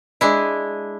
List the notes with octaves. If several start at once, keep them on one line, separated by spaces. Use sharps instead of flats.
G#3 D4 E4